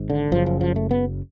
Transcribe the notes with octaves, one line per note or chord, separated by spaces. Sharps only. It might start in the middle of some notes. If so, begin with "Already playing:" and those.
Already playing: G#1 G#2
D3
F#1 F#2 C#3 F3
F3
F3
A3
B3